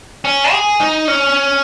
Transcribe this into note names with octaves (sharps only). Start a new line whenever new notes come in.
C#4
G#4
D#4
C#4